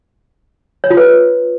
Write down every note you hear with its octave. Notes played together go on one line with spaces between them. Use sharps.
C#5
F4
B4